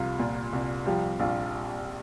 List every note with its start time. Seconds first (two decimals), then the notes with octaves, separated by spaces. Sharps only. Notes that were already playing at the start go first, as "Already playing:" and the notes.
Already playing: C2 F3 G3 F4
0.19 A#2 F4
0.53 C2
0.86 F3 G3 G4
1.20 A#1 F4